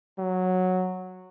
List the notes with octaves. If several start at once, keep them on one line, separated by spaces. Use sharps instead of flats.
F#3